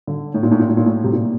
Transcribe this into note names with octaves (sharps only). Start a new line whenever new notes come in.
D3
A2
A#2
A2
A#2
A2
A#2
A2
C3
A#2